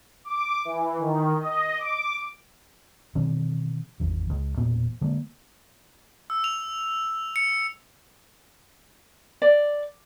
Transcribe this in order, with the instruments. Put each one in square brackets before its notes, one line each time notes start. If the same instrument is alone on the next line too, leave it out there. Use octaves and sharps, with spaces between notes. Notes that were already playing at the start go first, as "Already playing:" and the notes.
[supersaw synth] D6
E3
D#3
D#5
D6
[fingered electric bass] B2 D#3 E3 C4
G#1 E2
C#2
E1 A#2 B3
D3 G#3 A#3
[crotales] E6
F7
C#7
[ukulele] D5